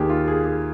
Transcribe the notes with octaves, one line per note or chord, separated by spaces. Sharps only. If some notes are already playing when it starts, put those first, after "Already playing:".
Already playing: D#2 D#3 G4 G#4
F4
G#4
G#4